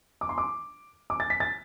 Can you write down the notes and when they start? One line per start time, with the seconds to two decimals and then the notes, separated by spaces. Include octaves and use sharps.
0.21 D6
0.29 C6
0.38 D6
1.10 D6
1.20 A6
1.30 B6
1.40 A6